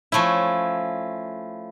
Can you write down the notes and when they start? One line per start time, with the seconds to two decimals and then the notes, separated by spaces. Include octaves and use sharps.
0.12 F3 A3 C#4 E4